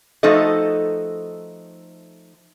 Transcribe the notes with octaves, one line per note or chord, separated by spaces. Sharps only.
F3 A3 D#4 F#4 A4 D#5